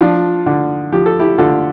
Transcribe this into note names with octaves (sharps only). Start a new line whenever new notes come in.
F3 D4 F4
D3
F3 G4
A4
E4 G4
D3 F4 A4